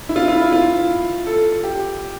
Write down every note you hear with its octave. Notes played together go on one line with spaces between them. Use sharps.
E4
F4
E4
F4
E4
F4
A4
G4